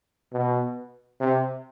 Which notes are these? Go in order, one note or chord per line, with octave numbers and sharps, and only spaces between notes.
B2
C3